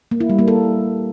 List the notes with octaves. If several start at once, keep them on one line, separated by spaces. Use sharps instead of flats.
A#3
E4
G3
A#3
A4